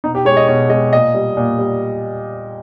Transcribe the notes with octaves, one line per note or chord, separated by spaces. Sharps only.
B2 D#4
G4
G#3 C#5
D#5
B2 C#5
G#3 D#5
A#2 D#5
G3
A#2
G3